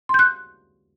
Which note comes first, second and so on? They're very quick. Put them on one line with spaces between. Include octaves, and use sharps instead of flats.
C6 G6 F#6